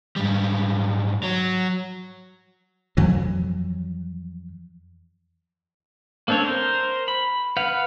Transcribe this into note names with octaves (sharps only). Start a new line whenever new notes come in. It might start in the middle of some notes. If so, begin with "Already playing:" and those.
G#2 G3
F#3
F2 E3 F#3
A#3 C4 D4 A4 C#5
A#4 C5
B5
B4 F5 F#5